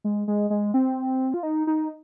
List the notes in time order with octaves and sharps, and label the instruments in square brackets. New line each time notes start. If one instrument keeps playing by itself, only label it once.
[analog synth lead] G#3
G#3
G#3
C4
F4
D#4
D#4